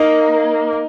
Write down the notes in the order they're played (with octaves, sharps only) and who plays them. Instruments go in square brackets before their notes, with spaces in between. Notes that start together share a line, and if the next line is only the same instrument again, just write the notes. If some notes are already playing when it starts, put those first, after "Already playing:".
Already playing: [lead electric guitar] A#3 [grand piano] D#4